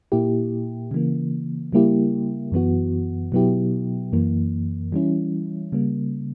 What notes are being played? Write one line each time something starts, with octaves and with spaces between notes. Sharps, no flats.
A#2 A#3 E4 G4
C#3 E3 A#3
C#3 G3 A#3 E4 G4
F#2 E3 B3 F#4
B2 F#3 B3 E4 G4
F#2 E3 A#3
E3 G3 C#4 E4
C#3 G3 A#3